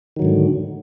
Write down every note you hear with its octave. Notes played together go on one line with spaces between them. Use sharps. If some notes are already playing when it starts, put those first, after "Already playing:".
G#2 D3 D#3 F#3